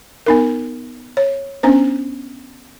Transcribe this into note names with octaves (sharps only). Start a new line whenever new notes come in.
B3 D#4 A#4
C#5
B3 C#4 D4 C5